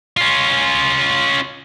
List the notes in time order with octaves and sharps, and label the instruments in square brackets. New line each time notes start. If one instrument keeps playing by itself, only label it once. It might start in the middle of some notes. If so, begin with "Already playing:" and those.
[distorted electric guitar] C#4 F4